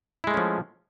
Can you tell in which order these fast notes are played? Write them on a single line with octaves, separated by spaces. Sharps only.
E4 G#3 A3 C#4 F3